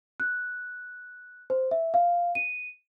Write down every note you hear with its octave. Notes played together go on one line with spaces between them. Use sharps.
F#6
C5
E5
F5
D#7